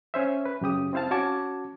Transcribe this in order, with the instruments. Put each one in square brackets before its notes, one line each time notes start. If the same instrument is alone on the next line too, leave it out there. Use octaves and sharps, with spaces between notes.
[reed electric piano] C#4 C5 E5
B4
F#2 C#3 G4 D#6
C4 E4 C5 F5 A5
C#4 F#4 F#5 A5 D6 G#6